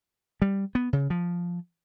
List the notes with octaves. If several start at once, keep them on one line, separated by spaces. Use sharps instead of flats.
G3
B3
C#3
F3